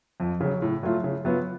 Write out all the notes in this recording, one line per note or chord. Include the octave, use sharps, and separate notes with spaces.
F2
C#3 F#3
A2
F#3 A3 F4
C#3
F#3 B3 F4